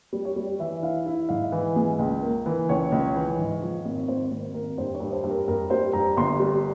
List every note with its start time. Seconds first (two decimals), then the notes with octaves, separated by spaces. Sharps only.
0.13 G3
0.25 C#5
0.36 G3
0.59 E3 E5
0.82 E4 F5
1.06 E4
1.29 G#2 F5
1.52 E3
1.76 G#3
1.99 C#2
2.23 A#3
2.46 E3
2.69 C#2 C#5
2.92 C#2
3.16 E3
3.39 G#2
3.62 F3
3.85 G#1
4.08 G#1 C5
4.31 G#1
4.54 G#1 A#4
4.78 G2 C5
4.94 C#5
5.00 G2
5.13 C5
5.24 G2
5.30 A#4
5.48 G2 A#4
5.70 G3 C5
5.93 G2 A#5
6.17 G1 C6
6.40 G3